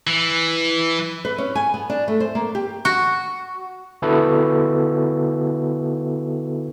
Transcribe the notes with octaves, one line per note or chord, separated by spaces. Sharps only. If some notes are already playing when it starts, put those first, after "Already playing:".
E3
B4
C#4
G#5
B3
D4
A3
C5
A#3
G4
F#4
D3 B3 E4 F#4 A4 B4